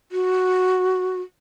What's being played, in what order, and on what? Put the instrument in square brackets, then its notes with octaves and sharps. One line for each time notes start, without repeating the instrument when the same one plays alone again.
[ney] F#4